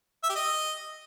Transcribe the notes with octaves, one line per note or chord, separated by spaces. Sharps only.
E5
G4
D#5